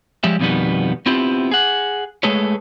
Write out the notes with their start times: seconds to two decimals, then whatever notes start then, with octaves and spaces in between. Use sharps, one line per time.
0.24 F3 G3 G#3 G4 E5
0.40 F2 B2 D#3 G3 B3
1.06 B3 C4 E4 F4 G4
1.51 G#4 F#5
2.23 G#3 A3 G#4 A4 B4 C#5